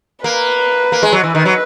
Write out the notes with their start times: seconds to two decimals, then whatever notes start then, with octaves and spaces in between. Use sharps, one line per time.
0.24 A#3 B4
0.92 A#3
1.03 G#3
1.12 F#3 B4
1.24 E3
1.35 D#3
1.45 F#3